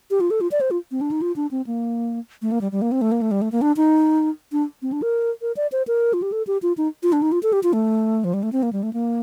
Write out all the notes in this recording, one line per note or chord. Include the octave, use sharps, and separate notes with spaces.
G4
F4
A4
F4
D5
C5
F4
C4
D4
D#4
F4
D4
C4
A#3
A3
A#3
G3
G3
A#3
C4
A3
A#3
A3
G3
A3
A#3
D4
D#4
D4
C4
D4
A#4
A#4
D5
C5
A#4
F4
G4
A4
G4
F4
D#4
F4
D4
D#4
F4
A4
G4
F4
A3
F3
G3
A3
C4
A#3
G3
A3
A#3